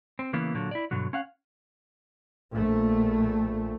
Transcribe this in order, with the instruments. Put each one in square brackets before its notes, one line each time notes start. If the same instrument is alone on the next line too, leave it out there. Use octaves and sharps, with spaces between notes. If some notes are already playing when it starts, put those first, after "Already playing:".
[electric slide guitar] C4
C#3 E3 A#3 B3
A#2 D3 F#3
E4 D5
G2 B2 D3 F#3
C#4 F5 F#5
[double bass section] A#1 A#2 A3